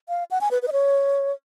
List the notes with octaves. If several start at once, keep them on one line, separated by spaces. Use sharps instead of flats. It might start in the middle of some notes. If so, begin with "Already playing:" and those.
F5
F#5
G#5
B4
B4
D#5
C#5